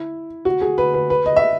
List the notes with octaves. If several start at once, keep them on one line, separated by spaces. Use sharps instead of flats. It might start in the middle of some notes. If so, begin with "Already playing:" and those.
Already playing: E4
F#4
G#4
B4
B4
B4
D#5
E5